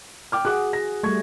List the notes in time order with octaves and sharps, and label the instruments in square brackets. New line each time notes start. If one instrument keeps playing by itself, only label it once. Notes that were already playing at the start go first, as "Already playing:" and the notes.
[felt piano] G5 D6 F6
[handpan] F#4 G#4 [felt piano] F#5 D6 F#6
[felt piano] A#6
[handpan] G3 A3 [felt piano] C#6 G#6